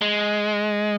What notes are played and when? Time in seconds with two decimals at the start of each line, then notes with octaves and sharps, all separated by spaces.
0.01 G#3